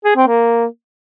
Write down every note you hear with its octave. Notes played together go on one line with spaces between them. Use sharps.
G#4
C4
A#3